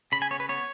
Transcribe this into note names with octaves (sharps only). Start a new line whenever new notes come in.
C#3 B5
G#5
B3 C#5
B4
B3 C#5